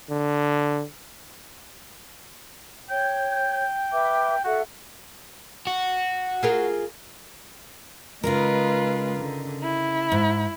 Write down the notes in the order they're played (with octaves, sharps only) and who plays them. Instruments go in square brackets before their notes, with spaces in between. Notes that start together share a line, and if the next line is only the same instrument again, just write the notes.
[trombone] D3
[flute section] C#5 G6 [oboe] G5
[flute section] B4 E5 D6
[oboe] F#4 [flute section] A4 E5 F#5
[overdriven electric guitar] F#4
[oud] F4 G#4 A#4
[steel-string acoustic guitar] C#3 D#4 A#4 [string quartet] G#3 F4 B4
[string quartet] D3
E4
[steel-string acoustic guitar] G#2